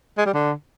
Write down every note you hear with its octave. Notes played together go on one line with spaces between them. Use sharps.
G#3
G3
D3